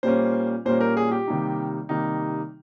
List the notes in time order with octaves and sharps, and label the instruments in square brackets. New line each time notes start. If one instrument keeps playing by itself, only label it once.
[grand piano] A#2 G3 A#3 C#4 C5
A#2 G3 A#3 C#4 C5
A#4
G#4
G4
C3 D#3 G3 A#3 D#4
C3 D#3 G3 A#3 D#4